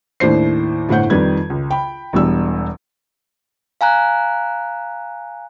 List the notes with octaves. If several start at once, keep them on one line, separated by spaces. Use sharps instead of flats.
D#2 A2 D4 E4 C5 C7
G1 A2 C5 F#5 G6
F2 D#3 G3 B4 G#6
C#2
G5 B5
E1 E2 G3 E6
F5 G#5 A#5 F#6